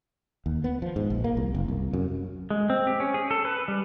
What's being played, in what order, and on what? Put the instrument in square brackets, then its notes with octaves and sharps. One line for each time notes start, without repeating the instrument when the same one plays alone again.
[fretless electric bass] D#2
B3
F3
G#2
A#1
A#3
C2
F#1
C2
F#2
[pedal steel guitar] G#3
C4
G4
C#4
G#4
A4
B4
G3